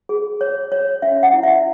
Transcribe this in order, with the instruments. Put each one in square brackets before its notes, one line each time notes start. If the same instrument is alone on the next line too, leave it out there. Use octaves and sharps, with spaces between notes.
[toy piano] G#4
C#5
C#5
C#4 E5
F#5
E4
E5